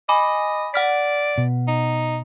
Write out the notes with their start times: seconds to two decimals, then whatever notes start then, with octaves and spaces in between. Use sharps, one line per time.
0.09 D#5 G#5 B5 D6
0.74 D5 F#5 F6 B6
1.38 B2
1.68 D#4